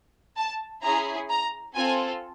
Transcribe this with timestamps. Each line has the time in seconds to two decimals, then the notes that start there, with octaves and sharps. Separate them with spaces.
0.37 A5
0.83 C#4 E4 G#4 A#5
1.30 A#5
1.75 C4 F4 A4 G#5